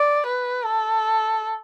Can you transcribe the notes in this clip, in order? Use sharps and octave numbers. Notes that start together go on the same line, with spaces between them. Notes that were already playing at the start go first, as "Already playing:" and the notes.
Already playing: D5
B4
A4